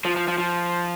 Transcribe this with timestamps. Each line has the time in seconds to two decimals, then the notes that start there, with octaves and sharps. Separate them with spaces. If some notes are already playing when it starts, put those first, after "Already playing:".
0.05 F3
0.16 F3
0.28 F3
0.38 F3